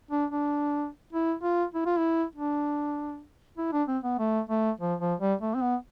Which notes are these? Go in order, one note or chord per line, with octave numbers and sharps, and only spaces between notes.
D4
D4
E4
F4
E4
F4
E4
D4
E4
D4
C4
B3
A3
A3
F3
F3
G3
A3
C4
B3